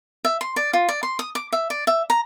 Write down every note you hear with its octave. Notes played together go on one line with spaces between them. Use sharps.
E5
C6
D5
F4
D5
C6
D#6
D6
E5
D5
E5
A#5